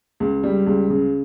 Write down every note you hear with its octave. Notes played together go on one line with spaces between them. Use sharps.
C#2
G3
C#2
C#3